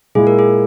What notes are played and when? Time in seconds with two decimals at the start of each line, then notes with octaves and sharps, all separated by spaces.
0.15 A#2 G#3 E4 G#4
0.27 A#4
0.39 G#4